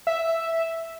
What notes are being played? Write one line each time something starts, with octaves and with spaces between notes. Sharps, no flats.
E5